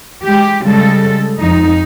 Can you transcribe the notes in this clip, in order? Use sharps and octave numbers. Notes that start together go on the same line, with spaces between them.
G#3 G4
C#3 G3 G#3 A4
F2 D#4